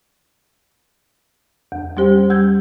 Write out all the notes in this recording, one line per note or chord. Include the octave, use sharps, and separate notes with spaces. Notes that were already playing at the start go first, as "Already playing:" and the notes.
E2
G3 C#4 G4 C5 G5
G3 E6 G6 G#6